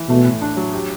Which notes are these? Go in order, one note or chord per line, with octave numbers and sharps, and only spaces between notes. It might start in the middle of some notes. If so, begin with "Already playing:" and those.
Already playing: E3
B2 A3
A2
D4
F#3
G4